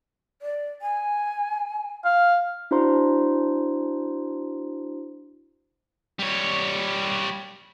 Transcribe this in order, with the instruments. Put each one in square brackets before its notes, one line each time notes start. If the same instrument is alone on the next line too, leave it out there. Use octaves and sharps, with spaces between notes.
[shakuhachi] D5
G#5
[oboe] F5
[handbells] D4 E4 F#4 C5 A#5 C6
[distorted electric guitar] G3 C#5